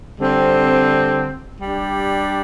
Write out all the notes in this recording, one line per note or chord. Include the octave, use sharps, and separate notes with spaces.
D3 G3 C4
G3 D4 G4